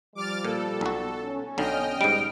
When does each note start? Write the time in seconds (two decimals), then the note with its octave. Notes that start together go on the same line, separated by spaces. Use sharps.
0.15 F3 G3 D6 F6 A6
0.45 A#2 A4
0.81 B1 F#4
1.23 C#4
1.58 B1 D3 D#5 G5 F6
2.01 G#2 G3 D7